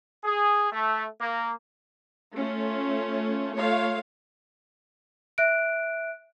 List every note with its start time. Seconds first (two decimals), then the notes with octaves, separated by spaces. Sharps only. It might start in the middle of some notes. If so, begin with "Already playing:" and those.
0.24 G#4
0.72 A3
1.20 A#3
2.35 A3 C#4 F4
3.56 A3 F4 C#5 F5
5.38 E5 F#6 D7